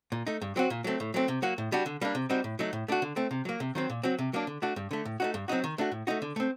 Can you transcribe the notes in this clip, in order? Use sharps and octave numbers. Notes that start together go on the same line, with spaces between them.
A#2
A3 D#4
G2
F#3 C4 F#4
A#2
F#3 A3 C4
A2
F#3 A3 C4
C3
F#3 A#3 F#4
A2
G3 D4 F#4
D3
G3 A#3 D4
C3
G3 C4 D#4 F#4
A2
F#3 A3 D#4
A2
A3 D4 F#4
D3
A3 C4
C3
F#3 A#3
C3
D#3 F#3 C4
A#2
F#3 C4 F#4
C3
F#3 A#3 D4
D3
A3 D4 F#4
G2
D3 A3
A2
A3 C4 D#4 F#4
G2
F#3 C4 D#4 F#4
D#3
A3 D4 F#4
A2
A3 D#4 F#4
D3
A3 C4